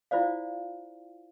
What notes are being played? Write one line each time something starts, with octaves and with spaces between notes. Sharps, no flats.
E4 F4 C5 D5 F5